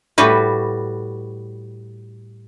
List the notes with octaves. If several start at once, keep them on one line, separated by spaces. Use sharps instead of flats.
A2 G3 F#4 B4